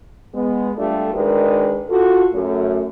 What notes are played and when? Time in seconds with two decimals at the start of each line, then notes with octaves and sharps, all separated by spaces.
0.33 G#3 B3
0.76 G3 A3 D4 F4 A4
1.14 D#3 G#3 D4 F#4 A#4 B4
1.89 F4 F#4 A4
2.33 F#2 A3